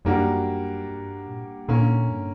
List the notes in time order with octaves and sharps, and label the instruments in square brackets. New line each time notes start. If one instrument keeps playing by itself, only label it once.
[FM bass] F#2 [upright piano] G3 A#3 D4 F#4 A#4
[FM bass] G2
A#2
[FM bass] A#2 [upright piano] D3 A#3 C#4
[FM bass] G2